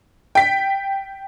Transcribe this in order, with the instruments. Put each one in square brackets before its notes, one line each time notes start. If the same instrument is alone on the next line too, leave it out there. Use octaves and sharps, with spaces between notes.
[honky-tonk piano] G5 B6